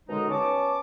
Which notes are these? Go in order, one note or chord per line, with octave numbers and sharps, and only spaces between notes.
F#2 B2 D3 G#3 D#4
B3 C#4 A5 C#6 D6